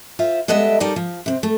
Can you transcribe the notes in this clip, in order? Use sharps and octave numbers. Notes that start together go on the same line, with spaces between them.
F4 C5 E5
G3 G#3 B3 A4 D#5 E5
G3 D#4 G4 A4 A#4 D5
F3
C3 C4
A3